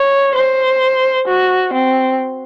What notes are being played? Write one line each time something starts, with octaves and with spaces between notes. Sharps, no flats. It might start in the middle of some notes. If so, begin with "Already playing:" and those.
Already playing: C#5
C5
F#4
C4